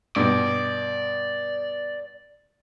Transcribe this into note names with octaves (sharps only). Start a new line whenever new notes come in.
G2 B2 D5